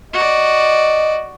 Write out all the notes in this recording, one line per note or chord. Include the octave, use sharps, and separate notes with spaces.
F#4 D5 D#5